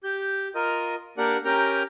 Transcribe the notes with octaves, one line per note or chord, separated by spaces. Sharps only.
G4 G6
F4 A#4 D#5
A#3 D4 G4 A#4 D5 F#5
C#4 G4 A#4 G5 A#5